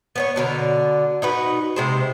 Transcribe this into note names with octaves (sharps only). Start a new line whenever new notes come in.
B3 C5 C#5
B2 D3 A#4
D#4 F#4 B4
C3 G#3 C5